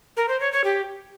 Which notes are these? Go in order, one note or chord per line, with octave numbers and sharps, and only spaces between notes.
A#4
C5
C#5
C#5
G4